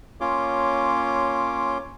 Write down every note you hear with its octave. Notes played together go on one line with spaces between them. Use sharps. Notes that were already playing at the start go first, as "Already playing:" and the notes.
A#3 C#4 F4 C#5 C6 D6